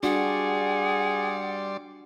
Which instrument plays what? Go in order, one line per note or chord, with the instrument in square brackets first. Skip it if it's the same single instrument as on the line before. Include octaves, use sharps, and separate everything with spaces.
[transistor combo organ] G3 D5 C6 [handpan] D4 F#4 [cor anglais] G#4 [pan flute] F#5